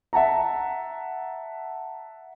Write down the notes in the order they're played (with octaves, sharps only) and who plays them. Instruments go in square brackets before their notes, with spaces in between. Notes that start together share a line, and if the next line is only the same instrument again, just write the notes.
[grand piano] E5 F#5 A5 A#5